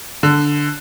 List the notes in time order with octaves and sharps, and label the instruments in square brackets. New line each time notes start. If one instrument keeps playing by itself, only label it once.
[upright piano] D3